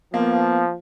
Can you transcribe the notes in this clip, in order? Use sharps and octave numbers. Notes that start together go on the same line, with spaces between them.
F3 A#3 B3